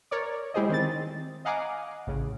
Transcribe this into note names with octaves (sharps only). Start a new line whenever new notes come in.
A#4 C#5 D5
G#3 E4 G4 G#4 C5 D#5
D#3 C4 A6
D#5 F5 F#5 G#5 A#5 D6
A1 C#3